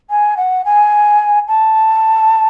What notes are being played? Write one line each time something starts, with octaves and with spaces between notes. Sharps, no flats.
G#5
F#5
G#5
A5